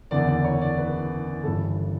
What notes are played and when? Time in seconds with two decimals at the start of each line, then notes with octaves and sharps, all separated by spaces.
0.11 F#1 E2 D3 D5
0.28 D5
0.44 C#5
0.61 D5
0.78 B4
1.43 G1 G2 E3 A4